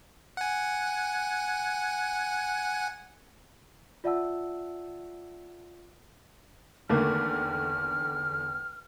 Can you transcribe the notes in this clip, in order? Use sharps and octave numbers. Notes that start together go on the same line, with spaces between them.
F#5 G#5
F4 D5 E5 F#5 A5 E6
E2 D3 D#3 A3 A#3 F6